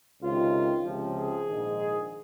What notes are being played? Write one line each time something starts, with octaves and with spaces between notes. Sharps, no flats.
C#2 C3 D#3 F4
C#2 C3 F3
G#4
A#1 G#2 D#3